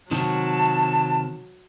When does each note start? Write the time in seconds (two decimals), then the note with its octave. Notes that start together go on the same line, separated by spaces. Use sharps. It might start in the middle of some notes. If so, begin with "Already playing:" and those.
0.11 C3 D#3 F#3 A5